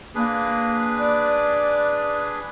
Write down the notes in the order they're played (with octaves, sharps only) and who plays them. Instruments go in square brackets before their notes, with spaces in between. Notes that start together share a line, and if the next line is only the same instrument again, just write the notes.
[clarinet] A#3 [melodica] D4 G#4 B4
[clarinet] D5